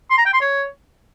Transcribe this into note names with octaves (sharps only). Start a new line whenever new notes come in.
C6
A#5
G5
C6
C#5